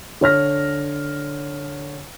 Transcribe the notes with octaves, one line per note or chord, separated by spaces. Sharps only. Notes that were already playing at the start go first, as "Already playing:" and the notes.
D3 C#5 F6 A#6